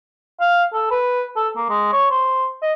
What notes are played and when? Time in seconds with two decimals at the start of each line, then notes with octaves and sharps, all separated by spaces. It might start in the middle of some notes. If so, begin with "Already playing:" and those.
0.41 F5
0.73 A4
0.91 B4
1.36 A4
1.56 A#3
1.69 G#3
1.93 C#5
2.11 C5
2.62 D#5